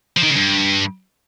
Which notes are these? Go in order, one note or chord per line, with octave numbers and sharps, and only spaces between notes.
F3
D#3
C#3
G2